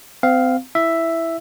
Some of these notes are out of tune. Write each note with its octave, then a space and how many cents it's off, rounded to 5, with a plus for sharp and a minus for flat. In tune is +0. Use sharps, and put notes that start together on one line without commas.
C4 -30 F5 +0
E4 +0 E5 +5